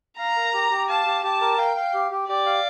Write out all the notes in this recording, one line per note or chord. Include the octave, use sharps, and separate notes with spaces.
F5 A#5
A#4
G4
G4
F5 A5
G4
G4 A5
A#4
F5 G5
F5
G4
G4
G4 D5
F5